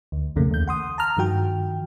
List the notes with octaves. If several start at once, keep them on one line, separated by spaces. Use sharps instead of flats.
D2
B1 F2 C#3 A3 A#3
D#2 G6
F#5 C6 D#6
A5 A#5 F6
G2 D#3 F3 F#4 G5